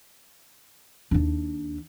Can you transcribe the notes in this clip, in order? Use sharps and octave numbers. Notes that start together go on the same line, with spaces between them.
D#2 D4